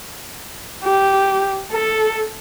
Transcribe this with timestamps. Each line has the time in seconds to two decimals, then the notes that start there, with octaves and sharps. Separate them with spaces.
0.84 G4
1.72 A4